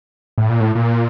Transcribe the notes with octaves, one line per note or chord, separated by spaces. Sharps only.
A2
A#2
A2
A#2